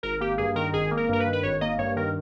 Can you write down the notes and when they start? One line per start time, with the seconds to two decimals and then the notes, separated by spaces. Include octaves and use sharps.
0.03 G#1 A#4
0.21 A#3 G4
0.38 G2 G#4
0.55 D#3 A#4
0.74 G#1 G#4
0.91 A#3
0.97 A#4
1.09 G2 A#4
1.20 B4
1.26 D#3
1.33 B4
1.43 G#1 C#5
1.61 A#3 D#5
1.78 G2 C#5
1.96 D#3 A#4